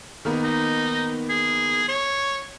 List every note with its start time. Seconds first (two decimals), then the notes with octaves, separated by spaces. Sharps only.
0.25 D#3 A#3 B3
0.43 D#4
1.30 G#4
1.88 C#5